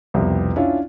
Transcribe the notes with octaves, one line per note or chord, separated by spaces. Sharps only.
C2 F2 B2 B3
C#4 D4 E4 F4